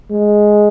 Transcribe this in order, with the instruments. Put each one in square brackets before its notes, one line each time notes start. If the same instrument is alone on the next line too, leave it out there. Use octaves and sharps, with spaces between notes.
[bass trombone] G#3